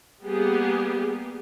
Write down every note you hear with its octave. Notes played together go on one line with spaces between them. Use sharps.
G3 A#3 B3 G4 G#4